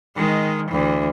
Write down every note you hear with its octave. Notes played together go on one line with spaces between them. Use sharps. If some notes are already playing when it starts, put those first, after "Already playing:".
D#3 G#3
D2 E3